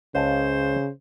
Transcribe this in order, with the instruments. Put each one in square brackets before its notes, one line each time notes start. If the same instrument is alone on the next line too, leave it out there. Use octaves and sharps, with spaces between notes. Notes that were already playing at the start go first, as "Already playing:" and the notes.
[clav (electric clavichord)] C#2 F5 A5 [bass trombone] C#3 [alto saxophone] C5